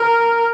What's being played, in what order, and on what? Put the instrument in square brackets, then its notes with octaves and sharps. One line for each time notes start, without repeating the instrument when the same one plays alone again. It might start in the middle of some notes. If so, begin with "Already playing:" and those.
Already playing: [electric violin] A#4